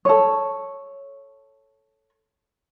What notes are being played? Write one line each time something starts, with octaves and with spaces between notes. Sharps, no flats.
A4 C#5